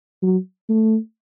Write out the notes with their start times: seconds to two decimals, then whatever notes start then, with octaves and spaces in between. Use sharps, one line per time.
0.23 F#3
0.69 A3